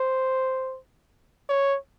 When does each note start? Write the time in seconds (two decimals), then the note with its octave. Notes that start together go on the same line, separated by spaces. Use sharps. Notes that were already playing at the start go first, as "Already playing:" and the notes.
Already playing: C5
1.49 C#5